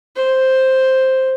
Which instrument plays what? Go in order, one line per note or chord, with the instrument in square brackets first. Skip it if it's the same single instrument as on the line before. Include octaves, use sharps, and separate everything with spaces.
[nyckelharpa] C5